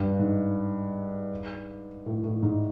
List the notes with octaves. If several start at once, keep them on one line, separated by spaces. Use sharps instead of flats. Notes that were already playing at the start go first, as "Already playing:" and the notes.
Already playing: G2
G#2
A2
A2
G#2